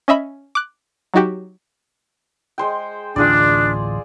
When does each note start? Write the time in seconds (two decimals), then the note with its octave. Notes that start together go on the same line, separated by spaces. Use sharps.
0.08 C#4 D#5 E5 B5
0.55 D6 F#6
1.14 F#3 D#4 F#4 G4
2.58 G#3 C5 G5
3.16 D1 A1 E3 D4 F4 G#4 D5